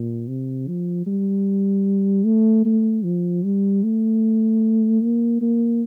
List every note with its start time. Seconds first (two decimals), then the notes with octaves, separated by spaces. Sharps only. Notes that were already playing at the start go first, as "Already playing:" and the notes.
Already playing: A#2
0.28 C3
0.67 F3
1.06 G3
2.25 A3
2.65 A3
3.04 F3
3.44 G3
3.83 A3
5.01 A#3
5.41 A#3